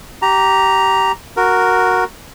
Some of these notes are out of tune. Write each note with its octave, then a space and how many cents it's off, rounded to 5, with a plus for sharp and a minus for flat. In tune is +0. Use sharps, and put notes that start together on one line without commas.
G4 -20 A#5 +0
F#4 -5 A#4 +0